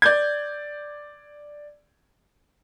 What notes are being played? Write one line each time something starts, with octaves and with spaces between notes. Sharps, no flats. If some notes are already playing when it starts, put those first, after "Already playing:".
D5 G6 G#6